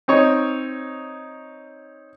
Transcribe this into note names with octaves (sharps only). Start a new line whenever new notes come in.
C4 D#4 C#5